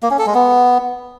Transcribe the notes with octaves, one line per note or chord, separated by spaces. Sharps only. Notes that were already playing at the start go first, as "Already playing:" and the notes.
A#3
C#4
A4
G#3
B3